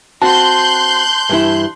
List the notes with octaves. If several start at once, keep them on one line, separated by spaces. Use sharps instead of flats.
C4 F#4 A5 C6 F#6 G6
G2 E3 E4